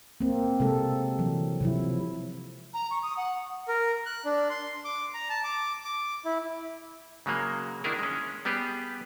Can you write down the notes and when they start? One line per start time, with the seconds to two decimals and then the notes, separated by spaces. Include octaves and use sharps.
0.20 A#3 C4
0.60 C3 G#3 A4
1.19 E3 F#3
1.61 C3 F3 E4
2.74 A#5
2.91 C#6
3.03 D#6
3.17 F#5
3.68 A#4
4.06 F#6
4.25 D4
4.50 C6
4.85 D6
5.14 A#5
5.30 A5
5.44 D6
5.85 D6
6.25 E4
7.26 C#3 F#3 G#3 A#3
7.84 D#3 D4 E4 G#4 A#4
7.99 G#3 C#4
8.45 G3 B3 G4 G#4